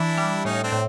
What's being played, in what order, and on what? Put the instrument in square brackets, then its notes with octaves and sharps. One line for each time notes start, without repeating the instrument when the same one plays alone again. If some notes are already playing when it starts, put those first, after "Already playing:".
Already playing: [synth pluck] E3 [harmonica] D4 E4
[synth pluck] G3
[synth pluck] A2 [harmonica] C#4 D#4
[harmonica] C4 D4
[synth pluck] A2